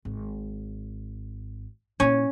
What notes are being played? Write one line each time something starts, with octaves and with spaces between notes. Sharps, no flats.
G#1
A#2 C#4 E4